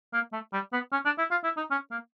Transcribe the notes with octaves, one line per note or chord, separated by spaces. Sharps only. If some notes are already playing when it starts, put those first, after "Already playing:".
A#3
A3
G3
B3
C#4
D4
E4
F4
E4
D#4
C#4
A#3